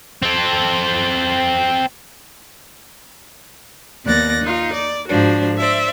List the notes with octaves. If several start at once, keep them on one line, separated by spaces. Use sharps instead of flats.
C4 A4
D#2 B3 D5 F#6 A6 A#6
D#4 F4
D5
G#2 F3 D4 F#4
C5 D5 E5